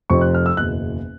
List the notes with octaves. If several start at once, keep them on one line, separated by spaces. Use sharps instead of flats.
F1 F2 C3 F3 C#6
F#6
F6
E6
F#1 E2 B2 F#6